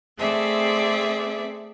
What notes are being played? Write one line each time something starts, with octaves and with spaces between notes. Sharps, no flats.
A3 C4 G#4 D5 E5